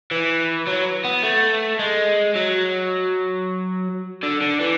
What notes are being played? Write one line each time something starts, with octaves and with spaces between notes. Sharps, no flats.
E3
F#3
B3
A3
G#3
F#3
D3
D3
E3